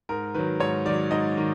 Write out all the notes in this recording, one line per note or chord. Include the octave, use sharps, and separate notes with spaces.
G#2 A#4
D#3 F#3 B4
G#2 C#5
D#3 F#3 D5
G#2 D#5
D#3